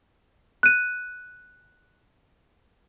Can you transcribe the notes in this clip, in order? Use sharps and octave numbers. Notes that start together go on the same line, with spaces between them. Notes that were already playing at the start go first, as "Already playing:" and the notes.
F#6 D#7